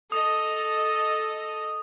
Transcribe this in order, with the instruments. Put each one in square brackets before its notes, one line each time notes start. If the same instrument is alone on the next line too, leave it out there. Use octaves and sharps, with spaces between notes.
[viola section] A4 D#5 [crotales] D#6